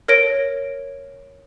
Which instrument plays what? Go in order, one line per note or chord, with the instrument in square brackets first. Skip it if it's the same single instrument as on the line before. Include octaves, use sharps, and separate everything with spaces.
[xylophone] A#4 C#5 A#6 D7